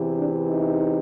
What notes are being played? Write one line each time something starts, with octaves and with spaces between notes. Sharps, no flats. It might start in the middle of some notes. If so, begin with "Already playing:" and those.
Already playing: E2 C3 E3
D4
D#4